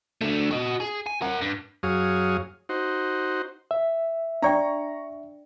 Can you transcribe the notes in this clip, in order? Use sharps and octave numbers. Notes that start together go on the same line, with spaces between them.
D3 A3
F#4 D#5
G#4
G#5
A#4 F#5
G2
F#2 F#3 G#4 C#5 F5 D#6
D#4 F#4 C5
E5
D4 D5 G5 A#5 C#6